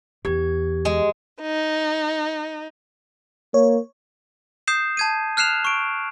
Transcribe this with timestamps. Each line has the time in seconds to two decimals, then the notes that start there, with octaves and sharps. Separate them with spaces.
0.25 E2 G4 G#6
0.85 G#3
1.40 D#4
3.54 A#3 C#5
4.67 D#6 G6 C7 E7
4.97 A5 G#6 D#7
5.37 F6 F#6 C7 E7 F7
5.65 C#6 D7